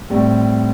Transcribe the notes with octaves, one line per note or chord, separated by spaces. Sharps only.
A2 G3 C4